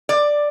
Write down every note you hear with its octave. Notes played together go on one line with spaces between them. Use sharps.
D5